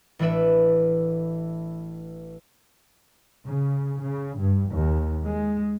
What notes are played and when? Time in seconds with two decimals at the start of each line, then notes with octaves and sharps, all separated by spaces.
0.19 A1 E3 A3 D4 B4 E5
3.48 C#3
4.03 C#3
4.40 G2
4.73 D#2
5.26 G#3